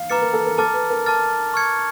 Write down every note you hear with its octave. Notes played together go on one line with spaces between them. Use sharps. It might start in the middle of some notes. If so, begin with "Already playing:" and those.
Already playing: F5
B4 A#5 D6 F6 A6 C#7
A#4
A4
A#4
A4 A5 D6 F6 A6
B4
A#4
A5 D6 F6 A6
C#6 F6 G#6 C#7